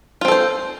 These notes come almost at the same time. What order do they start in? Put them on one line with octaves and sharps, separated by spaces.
F4 C4 A4 C5